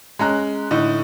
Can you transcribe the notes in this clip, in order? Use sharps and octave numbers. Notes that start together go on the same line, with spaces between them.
G#3 C#4 A#5 F#6
A2 D3 D#4